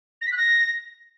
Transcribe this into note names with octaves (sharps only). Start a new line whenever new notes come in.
A#6
B6
F#6
A#6